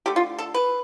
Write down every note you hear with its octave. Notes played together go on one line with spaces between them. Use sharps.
D3 A3 G4
F4
A4
B4